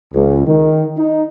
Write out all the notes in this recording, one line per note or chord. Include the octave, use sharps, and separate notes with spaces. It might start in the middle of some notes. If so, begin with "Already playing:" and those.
C#2
D#3
D#4